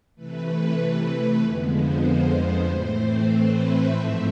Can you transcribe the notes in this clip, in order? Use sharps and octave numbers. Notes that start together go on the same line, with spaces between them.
C3 E3 A3 B4
F2 D3 F3 G#3 B3
C5
A2 E3 A3 C4
B4
E5
G#2 F3 A3 C4